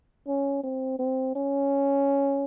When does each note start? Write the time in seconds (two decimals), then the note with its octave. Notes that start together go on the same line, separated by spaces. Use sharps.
0.27 C#4
0.64 C4
0.99 C4
1.36 C#4